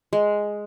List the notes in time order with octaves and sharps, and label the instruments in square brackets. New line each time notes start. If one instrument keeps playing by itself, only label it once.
[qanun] G#3